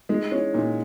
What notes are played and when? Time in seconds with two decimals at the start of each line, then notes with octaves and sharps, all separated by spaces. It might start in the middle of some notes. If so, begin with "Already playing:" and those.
0.09 G#3 D#4
0.31 C#4 E4
0.54 A#2 D#4